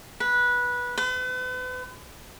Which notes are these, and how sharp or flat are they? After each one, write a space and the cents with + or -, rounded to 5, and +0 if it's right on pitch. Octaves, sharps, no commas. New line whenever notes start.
B4 -15
B4 +40